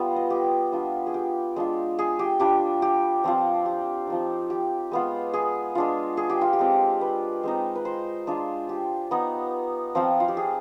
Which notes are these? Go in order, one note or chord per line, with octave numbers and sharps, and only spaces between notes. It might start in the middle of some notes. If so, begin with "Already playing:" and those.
Already playing: G3 B3 F4
D#5
G4
G3 D4 F4
G#4
G4
G#3 D4 F4
G#4
G4
G3 D4 F4 G4
G4
F3 C4 F4
G4
F3 C4 D#4
G4
G#3 B3 F4
G#4
G#3 D4 F4
G#4
G4
F4
G4
G#3 C4 F4
B4
G#3 C4 D#4
B4
C5
G#3 D4 F4
G4
B3 D#4
F3 C4 F4
F4
G4
G#4